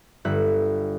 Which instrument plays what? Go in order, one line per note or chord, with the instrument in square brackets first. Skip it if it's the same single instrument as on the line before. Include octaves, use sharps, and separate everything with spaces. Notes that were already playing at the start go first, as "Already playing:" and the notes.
[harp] G1 G3 E5 F#6